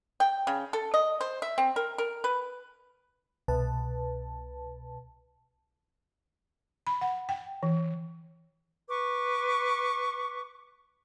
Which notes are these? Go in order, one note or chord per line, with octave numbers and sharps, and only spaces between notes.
G5
C#3
A4
D#5
C5
E5
C4
A#4
A#4
B4
C2 B2 B4 A5
B5
F#5
G5
E3
B4 C#6 D6